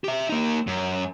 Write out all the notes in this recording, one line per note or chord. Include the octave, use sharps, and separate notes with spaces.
G4 E5
A#3 D#4
F#2